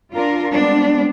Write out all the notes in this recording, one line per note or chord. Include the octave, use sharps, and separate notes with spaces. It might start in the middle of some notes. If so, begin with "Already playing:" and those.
D4 F4 A#4
G3 G#3 B3 C4 D4